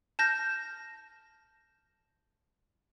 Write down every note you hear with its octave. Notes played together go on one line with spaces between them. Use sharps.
A5 F6 G6 A#6